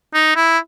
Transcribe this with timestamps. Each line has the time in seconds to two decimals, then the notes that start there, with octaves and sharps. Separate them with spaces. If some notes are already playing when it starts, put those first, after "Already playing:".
0.14 D#4
0.36 E4